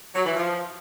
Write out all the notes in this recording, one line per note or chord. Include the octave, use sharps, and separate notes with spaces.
F#3
E3
F3